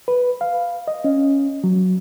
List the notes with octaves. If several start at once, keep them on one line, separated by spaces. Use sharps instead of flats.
B4
F5
D#5
C#4
F#3